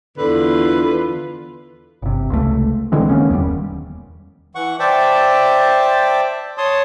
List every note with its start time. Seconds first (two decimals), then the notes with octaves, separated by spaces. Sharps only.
0.18 E2 D3 F4 B4
2.02 G1 C3
2.30 C#2 A3
2.92 D3 E3 G#3 C4
3.09 D#3 A#3 B3 C#4
3.29 D#1 E2 E3 G3
4.55 E3 F#5 C#6
4.79 C5 D5 E5 G5 A5 D6
6.58 C#5 A5 C6 D#6